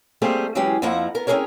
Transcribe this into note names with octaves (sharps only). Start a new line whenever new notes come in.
G3 A3 A#3 C4 G4 G#4
E3 F#3 G#3 C#4 G4 G#4
F2 F3 A#3 E4 F#5 A#5
B3 A#4
C4 C#4 D#4 G#4 A#4 C#5